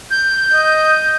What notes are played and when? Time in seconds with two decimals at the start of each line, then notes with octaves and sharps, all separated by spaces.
0.11 G6
0.53 D#5